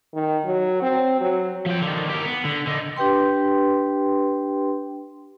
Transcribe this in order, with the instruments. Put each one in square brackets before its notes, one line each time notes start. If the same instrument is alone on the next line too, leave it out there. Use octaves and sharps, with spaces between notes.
[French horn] D#3
F#3
C4
F#3
[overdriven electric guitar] F3 G5
D3 D#3
G4 A#4
B3
D3
D3 D#4
[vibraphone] D4 G4 B4 G5 C6